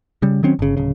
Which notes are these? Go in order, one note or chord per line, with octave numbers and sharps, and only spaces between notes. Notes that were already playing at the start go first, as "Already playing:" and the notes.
C#3 G3
D#3 F#3 C4 C#4
G1 C#3
D1 C#3